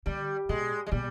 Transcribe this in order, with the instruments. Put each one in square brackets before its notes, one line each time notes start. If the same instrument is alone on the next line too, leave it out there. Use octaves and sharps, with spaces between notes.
[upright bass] D3 [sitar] G3
[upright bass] B2 [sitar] G#3
[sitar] G#3
[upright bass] B2 [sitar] G3